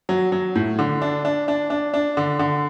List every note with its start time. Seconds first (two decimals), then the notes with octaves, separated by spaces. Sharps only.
0.09 F#3
0.32 F#3
0.55 A2
0.79 D3
1.02 D4
1.25 D4
1.48 D4
1.70 D4
1.94 D4
2.17 D3
2.39 D3